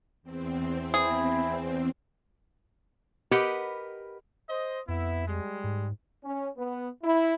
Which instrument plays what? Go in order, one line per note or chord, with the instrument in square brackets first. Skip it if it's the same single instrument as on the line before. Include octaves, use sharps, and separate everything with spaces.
[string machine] E2 C4
[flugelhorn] E4 [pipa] G#4
[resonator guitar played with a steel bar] G4 A#4 B4 D#5 F#5
[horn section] C5 D#5
[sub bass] F2 [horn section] B3 E4
[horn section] G3 G#3
[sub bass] G#2
[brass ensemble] C#4
B3
E4